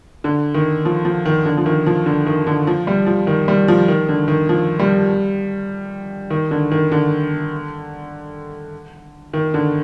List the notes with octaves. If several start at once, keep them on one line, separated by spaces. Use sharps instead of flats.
D3
D#3
F3
F3
D#3
D3
F3
D#3
F3
D3
D#3
D3
F3
G3
F3
D#3
G3
F3
D#3
D3
D#3
F3
G3
D#3
D3
D#3
D3
D#3
D3